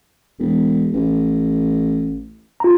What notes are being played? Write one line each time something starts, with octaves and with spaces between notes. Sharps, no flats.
E1
A1
F4 A#5